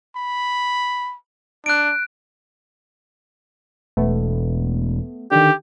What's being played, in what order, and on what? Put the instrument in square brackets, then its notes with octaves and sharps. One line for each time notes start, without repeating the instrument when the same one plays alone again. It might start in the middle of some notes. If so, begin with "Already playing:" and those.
[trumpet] B5
[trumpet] D4 [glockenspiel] F#6 D7
[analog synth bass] E1 [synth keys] A3 B3
[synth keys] D3 D#3 [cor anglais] G4